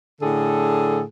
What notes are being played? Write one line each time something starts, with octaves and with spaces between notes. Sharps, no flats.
A2 D3 G#4 A4